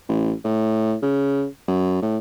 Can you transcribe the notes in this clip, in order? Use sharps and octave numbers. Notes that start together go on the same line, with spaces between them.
A1
A2
C#3
F#2
A2